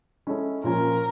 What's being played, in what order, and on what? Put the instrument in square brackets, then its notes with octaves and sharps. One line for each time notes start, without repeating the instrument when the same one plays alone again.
[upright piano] G#3 C#4 E4 A4
[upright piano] A#2 F3 A#3 C#4 F4 [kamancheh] A#4